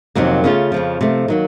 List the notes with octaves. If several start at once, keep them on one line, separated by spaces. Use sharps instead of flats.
F2 C3 D#3 F#3 A#3
C#3 A3 C#4 F4
F2 C#3 F3
C3 F3 A3
D#3 F#3 A#3